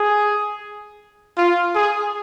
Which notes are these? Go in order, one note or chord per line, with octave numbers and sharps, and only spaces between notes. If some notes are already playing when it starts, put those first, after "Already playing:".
Already playing: G#4
F4
G#4